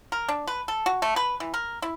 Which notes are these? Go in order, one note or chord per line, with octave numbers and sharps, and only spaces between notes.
A#4
D4
B4
A4
F#4
A3
B4
E3
A#4
E4